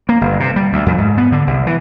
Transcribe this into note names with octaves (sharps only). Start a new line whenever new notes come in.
A#3
G1
C3
G3
D2
F2
G#2
B3
D3
C2
E3